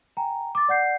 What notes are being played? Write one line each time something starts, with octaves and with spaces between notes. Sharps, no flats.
G5 G#5 A#5
D6 A6
D5 F#5 G6 C7